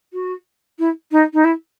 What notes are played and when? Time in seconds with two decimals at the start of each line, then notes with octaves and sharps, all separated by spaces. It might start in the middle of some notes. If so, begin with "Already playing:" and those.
0.13 F#4
0.79 E4
1.11 D#4
1.33 D#4
1.44 E4